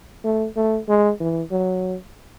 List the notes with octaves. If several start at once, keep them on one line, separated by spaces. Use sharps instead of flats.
A3
A3
G#3
E3
F#3